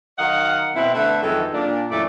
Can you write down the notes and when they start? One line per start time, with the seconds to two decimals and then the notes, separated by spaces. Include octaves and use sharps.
0.18 D#3 F#3 D#5 F5 F#5
0.76 B2 C4 E4
0.94 D3 A3 B4 E5
1.22 F2 D#3 E3 F#3 G#3 A4
1.54 A#2 D4
1.91 F#2 E3 A3 D5